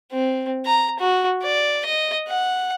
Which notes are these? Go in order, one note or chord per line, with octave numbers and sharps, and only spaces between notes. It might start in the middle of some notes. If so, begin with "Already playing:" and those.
C4
A#5
F#4
D5
D#5
F#5